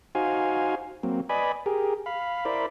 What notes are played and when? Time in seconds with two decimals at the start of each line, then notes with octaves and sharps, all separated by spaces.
0.15 D#4 F#4 C5 F5 G#5
1.03 F#3 A#3 C4
1.29 B4 D5 D#5 G#5 B5
1.66 G4 G#4 A#4
2.06 F5 B5
2.45 E4 A#4 C5 D5 B5